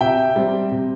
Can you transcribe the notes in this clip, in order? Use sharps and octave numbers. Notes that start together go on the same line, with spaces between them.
C3 E5 G5
G3 C4
C3